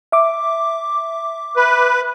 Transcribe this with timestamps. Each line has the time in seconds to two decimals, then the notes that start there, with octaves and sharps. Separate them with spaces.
0.12 E5 D6
1.56 B4